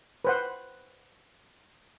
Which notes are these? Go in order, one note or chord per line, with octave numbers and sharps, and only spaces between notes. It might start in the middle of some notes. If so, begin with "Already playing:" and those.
B4 C5 F#5